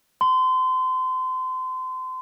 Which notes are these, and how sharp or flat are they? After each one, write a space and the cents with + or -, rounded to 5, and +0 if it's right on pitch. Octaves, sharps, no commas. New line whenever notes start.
C6 -30